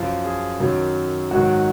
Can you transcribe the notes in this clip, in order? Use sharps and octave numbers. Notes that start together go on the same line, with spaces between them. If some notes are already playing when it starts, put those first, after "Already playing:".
Already playing: F#2 F3 F4
G#4
F#2 D#3 F#3
G#2 D#3 F#3 F#4